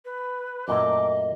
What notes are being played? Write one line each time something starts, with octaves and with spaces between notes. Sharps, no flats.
B4
F#2 A#2 A3 D#5 D6